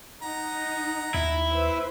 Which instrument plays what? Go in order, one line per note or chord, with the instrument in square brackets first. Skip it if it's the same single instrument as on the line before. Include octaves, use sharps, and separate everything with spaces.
[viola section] D#4 [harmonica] F#5 A#5
[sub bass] D#2 [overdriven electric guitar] E4
[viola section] B4 C5 E5